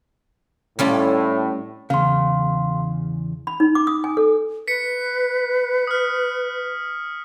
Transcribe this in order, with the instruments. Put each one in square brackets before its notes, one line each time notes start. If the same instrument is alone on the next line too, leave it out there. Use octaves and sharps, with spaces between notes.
[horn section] A2 [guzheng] G3 C#4 F4
[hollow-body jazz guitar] E2 C#3 [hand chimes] F5 C6
[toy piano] B5
D#4
D6
D#6
G#5
A4
[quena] B4 [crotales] B6 C#7
[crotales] D#6 F6